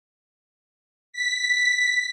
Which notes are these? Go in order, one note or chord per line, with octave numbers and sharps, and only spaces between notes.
B6